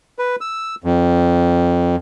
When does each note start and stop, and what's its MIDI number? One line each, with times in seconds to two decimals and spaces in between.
0.19 0.36 71
0.41 0.75 88
0.84 1.96 41